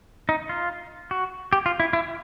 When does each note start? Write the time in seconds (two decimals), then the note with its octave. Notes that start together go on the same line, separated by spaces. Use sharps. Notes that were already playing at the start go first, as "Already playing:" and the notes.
0.29 D#4
0.49 F4
1.11 F#4
1.53 G4
1.66 F4
1.80 E4
1.93 E4